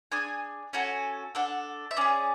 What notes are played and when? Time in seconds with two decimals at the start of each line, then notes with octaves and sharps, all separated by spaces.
0.12 D4 G#4 G#5
0.73 C#4 F#4 A4 G#5
1.35 D4 A4 F#5
1.91 E5
1.97 C#4 G#4 D5